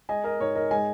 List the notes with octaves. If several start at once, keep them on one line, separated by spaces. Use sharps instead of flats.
G#3 D#5 G#5
A#4 D#5
G#2 C#5
A#4 D#5
G#3 D#5 G#5